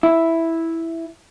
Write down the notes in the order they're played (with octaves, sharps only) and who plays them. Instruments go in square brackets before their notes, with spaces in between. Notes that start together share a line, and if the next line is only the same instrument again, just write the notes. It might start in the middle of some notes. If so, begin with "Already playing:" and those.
[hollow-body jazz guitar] E4